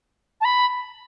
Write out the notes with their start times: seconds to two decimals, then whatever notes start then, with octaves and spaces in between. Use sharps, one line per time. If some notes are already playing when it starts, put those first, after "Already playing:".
0.41 A5
0.45 B5